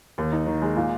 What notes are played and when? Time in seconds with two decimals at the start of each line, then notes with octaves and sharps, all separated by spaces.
0.18 D#2
0.32 D#4
0.46 D#3
0.62 G#3
0.76 A#2